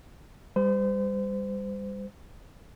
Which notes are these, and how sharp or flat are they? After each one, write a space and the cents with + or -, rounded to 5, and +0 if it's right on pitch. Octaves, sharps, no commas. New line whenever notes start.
G3 +25 C5 -35